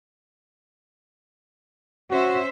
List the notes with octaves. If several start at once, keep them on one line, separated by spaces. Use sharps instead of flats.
C#4 F#4 C5 E5